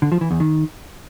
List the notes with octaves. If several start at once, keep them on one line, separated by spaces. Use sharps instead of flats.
D3
F3
E3
E2
D#3